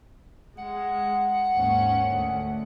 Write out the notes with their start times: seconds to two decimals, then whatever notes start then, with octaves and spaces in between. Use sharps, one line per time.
0.58 G#3 F#5
1.53 D#2 G#2 C#4
2.06 D2